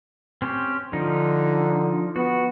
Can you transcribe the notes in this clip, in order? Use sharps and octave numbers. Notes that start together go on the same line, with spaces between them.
C4 C#4 G4
D3 F3 D#4
B3 F#4